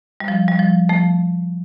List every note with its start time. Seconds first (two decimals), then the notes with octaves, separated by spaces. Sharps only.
0.20 G3
0.28 F3
0.48 G3
0.59 F3
0.89 F3 A3